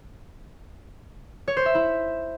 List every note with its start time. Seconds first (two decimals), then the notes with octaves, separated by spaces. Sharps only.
1.48 C#5
1.57 C5
1.66 E5
1.75 E4